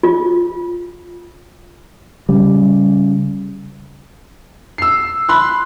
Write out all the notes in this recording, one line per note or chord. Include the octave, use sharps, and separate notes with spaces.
F4
C#3 G3
E6 C7
B5 C6 F#6